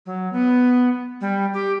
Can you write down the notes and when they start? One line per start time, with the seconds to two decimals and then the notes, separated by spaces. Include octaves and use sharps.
0.06 F#3
0.33 B3
1.21 G3
1.53 G4